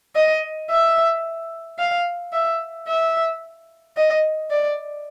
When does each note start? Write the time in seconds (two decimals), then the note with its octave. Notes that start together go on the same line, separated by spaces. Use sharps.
0.15 D#5
0.70 E5
1.79 F5
2.33 E5
2.88 E5
3.97 D#5
4.51 D5